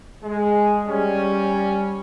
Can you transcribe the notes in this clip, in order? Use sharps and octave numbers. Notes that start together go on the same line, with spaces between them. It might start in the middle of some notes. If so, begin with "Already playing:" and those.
G#3
G3 C#4